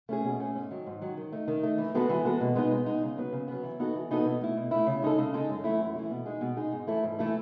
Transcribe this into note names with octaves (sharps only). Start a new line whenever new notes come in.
A3 C#4 G#4
B2
A3 C#4 G#4
G#2
D#3 F#3
G#2
D#3 F#3
D#3
A3 D#4
D#3
A3 D#4
E3
G#3 B3 F#4 A4
E3
G#3 B3 F#4 A4
B2
G#3 B3 D#4
B2
G#3 B3 D#4
C#3
F#3 B3
C#3
F#3 B3
E3
B3 D#4 F#4 A4
E3
B3 D#4 F#4 A4
B2
A3 E4
B2
A3 E4
C#3
G#3 D#4 A4
C#3
G#3 D#4 A4
F#2
E3 A3 E4
F#2
E3 A3 E4
B2
G#3 D#4 G#4
B2
G#3 D#4 G#4
G#2
E3 A3 E4 A4
G#2
E3 A3 E4 A4